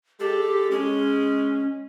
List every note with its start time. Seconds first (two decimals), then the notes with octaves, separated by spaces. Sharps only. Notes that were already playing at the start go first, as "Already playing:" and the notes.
0.20 G#3 G4 A4
0.71 G#3 C#4